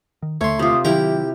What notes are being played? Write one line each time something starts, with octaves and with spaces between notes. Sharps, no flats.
D#3
D#2 D3 A3 C#5 B5 C6
C3 F4 D6 D#6
D#3 F#3 E4 G4 A#4 G5